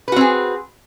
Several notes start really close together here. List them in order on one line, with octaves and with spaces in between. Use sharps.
B4 F#4 C4 G#4